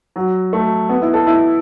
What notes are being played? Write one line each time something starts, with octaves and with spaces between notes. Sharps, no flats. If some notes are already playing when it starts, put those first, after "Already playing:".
F#3
A3
B3
E4
A4
E4